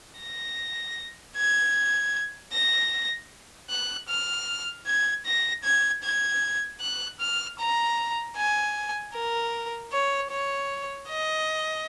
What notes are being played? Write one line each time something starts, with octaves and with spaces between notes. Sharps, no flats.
A#6
G#6
A#6
F#6
F6
G#6
A#6
G#6
G#6
F#6
F6
A#5
G#5
A#4
C#5
C#5
D#5